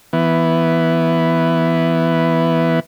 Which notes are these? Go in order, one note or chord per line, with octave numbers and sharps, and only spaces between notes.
E3 B3